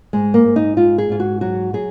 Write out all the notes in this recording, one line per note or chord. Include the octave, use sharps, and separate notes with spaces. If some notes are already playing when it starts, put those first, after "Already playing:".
G#2 G#3
A#3
G#2
D#4
G#3 F4
G#4
G#2 F4
F#4
F#3 F#4
F#3 G#4